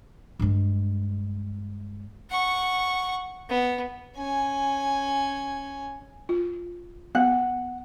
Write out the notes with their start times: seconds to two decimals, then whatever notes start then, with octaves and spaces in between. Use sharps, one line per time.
0.39 G2 G#3
2.30 F#5 C#6
3.49 B3
4.16 C#4 G#5
6.29 F4
7.15 B3 F#5